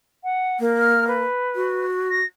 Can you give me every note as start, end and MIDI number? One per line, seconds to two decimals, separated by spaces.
0.24 0.58 78
0.60 1.21 58
0.79 1.07 89
1.08 1.86 71
1.55 2.20 66
2.10 2.25 94